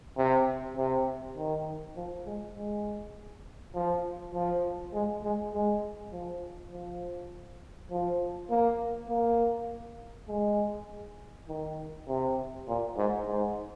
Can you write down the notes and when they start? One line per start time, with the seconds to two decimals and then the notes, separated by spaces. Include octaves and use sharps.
0.17 C3
0.77 C3
1.37 D#3
1.96 F3
2.26 G#3
2.56 G#3
3.74 F3
4.34 F3
4.93 G#3
5.23 G#3
5.53 G#3
6.12 F3
6.72 F3
7.91 F3
8.50 A#3
9.10 A#3
10.29 G#3
11.48 D#3
12.08 C3
12.68 A#2
12.97 G#2
13.27 G#2